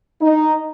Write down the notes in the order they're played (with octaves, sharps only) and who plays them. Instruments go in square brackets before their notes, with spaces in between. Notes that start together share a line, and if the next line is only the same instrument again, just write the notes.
[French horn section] D#4